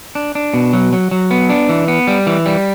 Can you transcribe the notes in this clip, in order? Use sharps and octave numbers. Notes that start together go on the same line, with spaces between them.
D4
D4
B2
F#3
F#3
F#3
B3
D4
E3
B3
G3
E3
G3